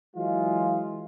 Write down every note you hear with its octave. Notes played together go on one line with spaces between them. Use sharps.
E3 F#3 G#3 F4